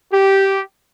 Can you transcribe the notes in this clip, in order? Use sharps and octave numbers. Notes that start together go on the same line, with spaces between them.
G4